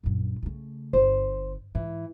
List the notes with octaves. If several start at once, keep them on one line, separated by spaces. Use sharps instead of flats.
A#1 F#2
C#3 A3
G1 C5
G#2 E3